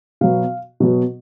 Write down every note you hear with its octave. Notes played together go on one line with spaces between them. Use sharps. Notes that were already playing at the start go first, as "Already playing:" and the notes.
B2 F#3 B3 F5
B2 F#3 B3